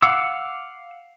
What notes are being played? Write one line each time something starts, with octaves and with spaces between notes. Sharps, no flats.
F5 F#5 D6 E6